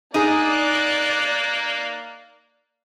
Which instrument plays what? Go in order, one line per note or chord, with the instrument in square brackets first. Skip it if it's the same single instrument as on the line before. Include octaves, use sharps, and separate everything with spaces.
[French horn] A#3 [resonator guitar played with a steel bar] D#4 G#4 [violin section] D5 F#6